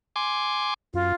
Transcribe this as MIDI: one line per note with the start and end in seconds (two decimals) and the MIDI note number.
0.16 0.74 80
0.16 0.74 84
0.16 0.74 86
0.94 1.12 42
0.94 1.14 65